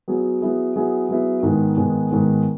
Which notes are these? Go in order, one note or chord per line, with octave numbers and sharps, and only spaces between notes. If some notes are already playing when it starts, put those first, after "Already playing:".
F#3 B3 E4 G#4
F#3 B3 E4 G#4
F#3 B3 E4 G#4
F#3 B3 E4 G#4
G#2 D#3 G#3 B3
G#2 D#3 G#3 B3
G#2 D#3 G#3 B3